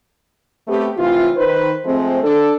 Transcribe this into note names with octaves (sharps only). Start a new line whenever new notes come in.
F#3 A3 B3 C4 G4
A2 C3 E3 F4
D#3 B4 C5
F3 G#3 A3 C4
D4 A4